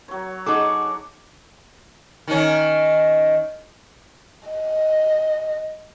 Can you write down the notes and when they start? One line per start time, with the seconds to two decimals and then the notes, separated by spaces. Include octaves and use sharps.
0.08 F#3 C#5
0.46 D#4 G#4 A4 F#5 C#6 D6
2.28 D#3 C#4
4.49 D#5